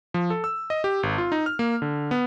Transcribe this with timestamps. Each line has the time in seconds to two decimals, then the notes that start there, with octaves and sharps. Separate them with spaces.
0.14 F3
0.30 A4
0.44 E6
0.70 D#5
0.84 G4
1.03 G#1
1.18 F4
1.32 D#4
1.46 F6
1.59 A#3
1.82 D3
2.11 B3